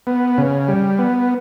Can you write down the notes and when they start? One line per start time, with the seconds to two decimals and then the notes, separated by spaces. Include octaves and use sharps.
0.07 B3
0.38 C#3
0.68 G3
0.99 B3